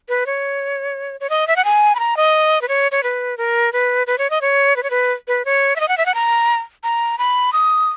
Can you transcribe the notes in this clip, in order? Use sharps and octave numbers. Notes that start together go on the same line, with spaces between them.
B4
C#5
C#5
D#5
E5
F#5
G#5
B5
A#5
D#5
B4
C#5
C#5
B4
A#4
B4
B4
C#5
D#5
C#5
B4
C#5
B4
B4
C#5
E5
D#5
F#5
E5
F#5
A#5
A#5
B5
D#6